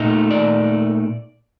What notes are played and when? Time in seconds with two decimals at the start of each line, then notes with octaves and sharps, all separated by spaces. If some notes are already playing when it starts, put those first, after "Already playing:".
Already playing: A#2 A3 D#4
0.30 D5